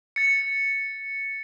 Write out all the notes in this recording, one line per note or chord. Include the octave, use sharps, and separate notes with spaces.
A6 C#7